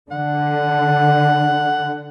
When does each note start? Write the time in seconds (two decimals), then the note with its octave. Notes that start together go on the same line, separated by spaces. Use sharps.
0.11 D3 F#5